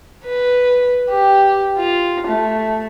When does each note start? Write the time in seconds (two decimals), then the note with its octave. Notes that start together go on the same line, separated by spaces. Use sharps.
0.24 B4
1.09 G4
1.77 F4
2.27 A3